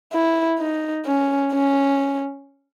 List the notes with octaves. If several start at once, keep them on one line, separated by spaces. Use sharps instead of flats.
E4
D#4
C#4
C#4